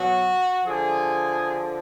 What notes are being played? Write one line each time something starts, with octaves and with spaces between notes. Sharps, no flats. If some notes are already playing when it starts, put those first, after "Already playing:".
Already playing: B2 F#3 F#4
D3 F3 G#4